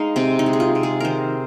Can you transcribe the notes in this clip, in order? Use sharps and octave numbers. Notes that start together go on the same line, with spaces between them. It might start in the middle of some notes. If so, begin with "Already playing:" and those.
Already playing: G#3 D#4 F5
C3 C4
D#4
G#3
G#4
F4
C3
G#4
D#3 A#4 C5